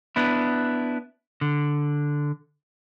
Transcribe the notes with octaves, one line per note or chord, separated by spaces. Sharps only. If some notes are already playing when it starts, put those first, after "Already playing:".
B3 D4 E4
D3